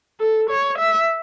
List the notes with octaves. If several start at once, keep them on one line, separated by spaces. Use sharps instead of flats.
A4
C#5
E5